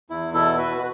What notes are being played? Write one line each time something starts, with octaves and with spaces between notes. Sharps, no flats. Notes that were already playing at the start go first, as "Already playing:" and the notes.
E2 E4
B2 E4 A4
A4
B2 F#4 B4
B4